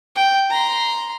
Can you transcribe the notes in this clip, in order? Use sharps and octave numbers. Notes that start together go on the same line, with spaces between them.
G5
A#5 C6